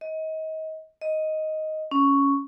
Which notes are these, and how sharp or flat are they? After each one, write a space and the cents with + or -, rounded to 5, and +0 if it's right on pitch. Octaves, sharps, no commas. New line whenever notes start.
D#5 +30
D#5 +5
C#4 +5